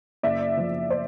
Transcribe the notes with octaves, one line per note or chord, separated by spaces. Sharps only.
F#1 D5 E5
F3
C5 D5